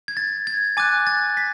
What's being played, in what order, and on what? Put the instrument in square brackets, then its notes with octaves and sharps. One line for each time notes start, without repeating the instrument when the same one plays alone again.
[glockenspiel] G#6
A6
G#6
G#5 D6 F#6 A6
A6
B6